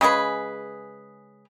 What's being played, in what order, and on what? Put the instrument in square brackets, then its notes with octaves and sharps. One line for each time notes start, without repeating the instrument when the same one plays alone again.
[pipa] C#3 G#3 G#4 B4